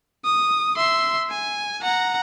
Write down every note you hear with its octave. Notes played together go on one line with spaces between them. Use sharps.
D#6
E5 C6
G#5
F#5 A#5